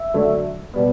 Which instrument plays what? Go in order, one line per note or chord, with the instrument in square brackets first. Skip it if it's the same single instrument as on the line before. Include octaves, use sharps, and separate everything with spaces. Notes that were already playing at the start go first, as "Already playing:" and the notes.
Already playing: [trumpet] E5
[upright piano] D3 F#3 A3 D4
B2 G3 B3